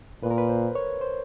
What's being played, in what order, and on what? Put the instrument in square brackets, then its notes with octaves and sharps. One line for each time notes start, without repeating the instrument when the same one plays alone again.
[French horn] A#2 [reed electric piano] B4
[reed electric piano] A#4
B4
C5
C#5
C5